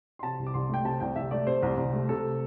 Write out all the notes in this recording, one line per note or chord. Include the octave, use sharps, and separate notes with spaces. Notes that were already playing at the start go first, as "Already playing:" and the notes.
C6
C3 A5
C2
D6
C2 C6
A3 G5
C3 A5
C2 G5
C2 E5
A3 D5
C3 C5
C2
C2
A3
C3 A4